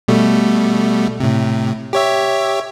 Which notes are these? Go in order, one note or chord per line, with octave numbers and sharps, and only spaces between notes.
B2 G3 A3
A2 C3
G4 C#5 E5